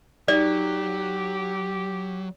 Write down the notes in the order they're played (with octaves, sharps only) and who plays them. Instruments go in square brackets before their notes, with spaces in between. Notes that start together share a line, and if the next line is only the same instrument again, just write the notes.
[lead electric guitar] F#3 [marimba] D#4 [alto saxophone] G4 [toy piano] D5